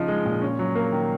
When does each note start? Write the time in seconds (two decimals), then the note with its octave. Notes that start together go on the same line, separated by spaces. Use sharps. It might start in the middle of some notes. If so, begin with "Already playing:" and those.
Already playing: C#3 F3 D#4
0.08 G#3
0.25 A#2
0.42 C#4
0.59 F#3
0.75 A#3
0.92 D#3